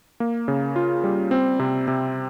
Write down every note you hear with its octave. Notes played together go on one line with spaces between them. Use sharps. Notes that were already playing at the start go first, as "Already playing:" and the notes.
A#3
C#3
F4
G3
C4
C3
C3